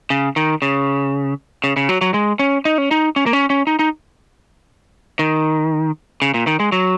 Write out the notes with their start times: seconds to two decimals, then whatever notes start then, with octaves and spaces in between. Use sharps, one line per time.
0.10 C#3
0.36 D#3
0.62 C#3
1.64 C#3
1.76 C#3
1.89 F#3
2.01 F#3
2.14 G#3
2.39 C#4
2.65 D#4
2.78 C#4
2.91 D#4
3.16 C#4
3.26 A#3
3.33 C#4
3.50 C#4
3.67 D#4
3.79 D#4
5.19 D#3
6.22 C#3
6.34 A#2
6.47 D#3
6.60 G#3
6.72 F#3